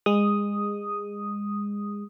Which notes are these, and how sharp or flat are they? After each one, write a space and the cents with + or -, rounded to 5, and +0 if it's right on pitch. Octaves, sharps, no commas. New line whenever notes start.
G#3 -25 D#6 +0